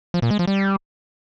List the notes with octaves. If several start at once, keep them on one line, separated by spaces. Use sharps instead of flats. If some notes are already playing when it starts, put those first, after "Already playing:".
F3
A#2
G#3
F3
G3